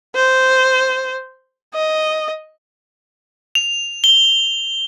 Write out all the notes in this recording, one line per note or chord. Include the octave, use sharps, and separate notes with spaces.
C5
D#5
F7
G7